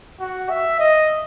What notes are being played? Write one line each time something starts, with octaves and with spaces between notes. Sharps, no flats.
F#4
E5
D#5